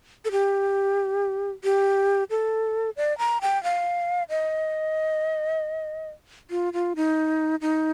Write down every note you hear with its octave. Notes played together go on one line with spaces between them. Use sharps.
A4
G4
G4
A4
D5
A#5
G5
F5
D#5
F4
F4
D#4
D#4